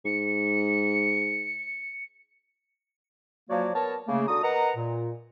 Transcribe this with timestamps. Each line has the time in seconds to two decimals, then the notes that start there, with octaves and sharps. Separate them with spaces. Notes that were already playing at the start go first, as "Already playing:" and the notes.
0.05 G#2 C#7
3.49 F3 F#3 A#3 F#4 C#5 D5
3.75 B3 A#4 C#5 A5
4.08 C#3 A3 A#3
4.28 D3 F#4 A#5 D#6
4.43 A#4 B4 D#5 F#5 A#5
4.77 A#2